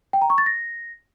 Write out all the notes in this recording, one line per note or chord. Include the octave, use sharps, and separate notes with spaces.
G5
A#5
C#6
A6
A#6